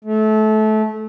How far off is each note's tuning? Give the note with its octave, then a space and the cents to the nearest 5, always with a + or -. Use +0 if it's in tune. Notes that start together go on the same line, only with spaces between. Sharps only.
A3 -25